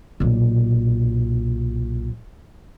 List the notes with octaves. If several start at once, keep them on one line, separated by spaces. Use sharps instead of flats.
B1 A#2